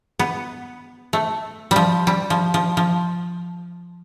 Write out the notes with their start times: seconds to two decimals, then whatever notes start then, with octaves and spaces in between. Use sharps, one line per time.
0.19 B3
1.13 A3
1.71 F3 G3
2.07 G3
2.30 F3
2.54 F3
2.77 F3